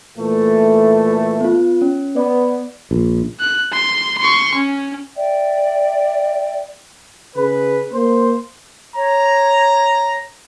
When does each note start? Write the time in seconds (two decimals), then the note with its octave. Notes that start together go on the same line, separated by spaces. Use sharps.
0.17 A#2 E3 A3
1.41 B3 F4
1.82 C#4
2.16 B3 D5
2.91 A#1
3.40 F#6
3.73 C6
4.18 C6 C#6
4.55 C#4
5.16 D5 E5 G5
7.36 C#3 G#4 B4
7.92 A#3 C5
8.96 C#5 A#5